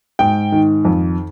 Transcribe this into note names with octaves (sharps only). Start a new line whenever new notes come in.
G#2 G5
D#3
F2